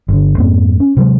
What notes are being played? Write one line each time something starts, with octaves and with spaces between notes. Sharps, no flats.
G1 D3
F2 G#2 A#3 C4
C#4
C3 F#3 G#3